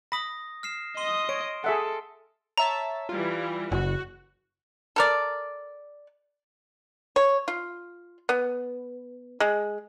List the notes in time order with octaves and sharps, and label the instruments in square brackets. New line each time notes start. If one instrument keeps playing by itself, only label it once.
[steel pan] B5 [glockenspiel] D#6 A#6
[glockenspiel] F6 C7 E7
[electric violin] D#5 D#6 [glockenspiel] C6 D#7 G7
[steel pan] C#5 [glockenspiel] D7
[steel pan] G#4 E5 F#5 [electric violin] A4
[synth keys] C#5 E5 A5 [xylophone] A#5
[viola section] E3 G3 [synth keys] F4
[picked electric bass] F#1 [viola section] F#4
[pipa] A4 A#4 D5
C#5
F4
B3
G#3